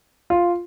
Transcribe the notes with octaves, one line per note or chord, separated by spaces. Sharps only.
F4